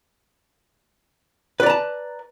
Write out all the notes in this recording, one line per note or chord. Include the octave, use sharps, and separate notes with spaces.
B4 D5 A5 A#5